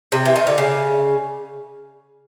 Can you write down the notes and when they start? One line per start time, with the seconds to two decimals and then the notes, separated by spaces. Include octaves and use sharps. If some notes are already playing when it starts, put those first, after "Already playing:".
0.12 C3
0.25 E3
0.36 D#3
0.47 D3
0.58 C#3